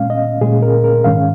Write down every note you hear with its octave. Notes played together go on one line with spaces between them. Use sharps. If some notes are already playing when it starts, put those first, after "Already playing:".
Already playing: A#2 G#3 C#4 F5
D#5
A#2 G#3 C#4 G#4
A#4
A#4
G#2 D#3 G#3 C#4 F5